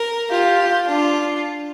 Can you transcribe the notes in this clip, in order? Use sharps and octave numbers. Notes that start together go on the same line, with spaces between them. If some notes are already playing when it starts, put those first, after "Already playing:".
Already playing: A#4
F4 G4
D4 F4